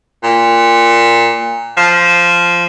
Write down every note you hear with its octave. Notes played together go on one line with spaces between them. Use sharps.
A#2
F3